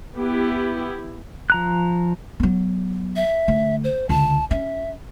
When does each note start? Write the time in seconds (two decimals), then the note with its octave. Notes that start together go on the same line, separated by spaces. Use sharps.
0.17 B3 E4 G4
1.50 F3 A#5 F#6
2.40 F#3 B3
3.16 E5
3.48 D3 A3
3.84 C5
4.09 C#2 D3 A5
4.51 C#4 E5